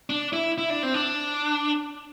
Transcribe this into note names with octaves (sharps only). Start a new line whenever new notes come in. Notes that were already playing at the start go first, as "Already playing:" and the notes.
D4
E4
E4
D4
C4
D4